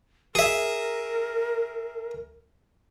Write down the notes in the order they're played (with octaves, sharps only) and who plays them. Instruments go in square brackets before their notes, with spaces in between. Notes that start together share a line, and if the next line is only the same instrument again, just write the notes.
[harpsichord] G#4 E5 [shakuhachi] A#4